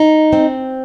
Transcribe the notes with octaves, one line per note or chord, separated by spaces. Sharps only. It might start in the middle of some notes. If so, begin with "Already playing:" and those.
Already playing: D#4
C4